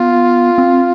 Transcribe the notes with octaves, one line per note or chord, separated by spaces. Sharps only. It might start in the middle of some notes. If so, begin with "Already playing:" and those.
Already playing: B3 F4
C4